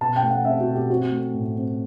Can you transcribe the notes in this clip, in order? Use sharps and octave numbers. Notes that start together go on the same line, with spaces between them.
B2 A5
G5
A3
F#5
C4 E5
F#4
B2
G4
C4 F#4
A3
A2
C4